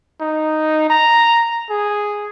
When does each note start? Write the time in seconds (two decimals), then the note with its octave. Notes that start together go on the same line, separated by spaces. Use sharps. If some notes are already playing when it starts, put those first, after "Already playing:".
0.21 D#4
0.90 A#5
1.70 G#4